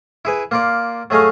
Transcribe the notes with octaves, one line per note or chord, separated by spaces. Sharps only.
E4 G#4 B4
A#3 F4 D5
F#3 A3 G#4 D#5 F5